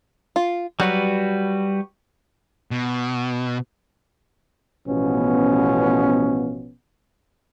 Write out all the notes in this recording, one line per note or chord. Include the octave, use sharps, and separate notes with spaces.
F4
F#3 G3 F#4 B4
B2
A1 B2 F3 B3 C#4